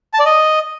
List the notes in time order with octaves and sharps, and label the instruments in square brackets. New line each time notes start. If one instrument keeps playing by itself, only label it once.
[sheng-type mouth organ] A5
D5
D#5